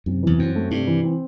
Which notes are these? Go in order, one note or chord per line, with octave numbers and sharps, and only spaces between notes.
F#2 C3
E2 E3
F#2 C4
A3
G2 C3
E3
C4